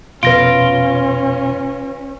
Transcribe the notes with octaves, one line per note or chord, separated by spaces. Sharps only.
F2 B2 C#4 F4 B4 A#6 D7